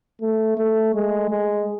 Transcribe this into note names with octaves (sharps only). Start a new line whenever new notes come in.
A3
A3
G#3
G#3